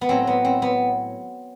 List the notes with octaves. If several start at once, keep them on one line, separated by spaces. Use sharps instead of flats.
B3
A2 F#3 A3 C4
B3
C4
B3